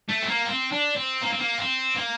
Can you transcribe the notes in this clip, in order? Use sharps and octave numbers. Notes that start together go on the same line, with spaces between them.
A3
C4
A#3
C4
D4
C4
A#3
C4
A#3
C4
A#3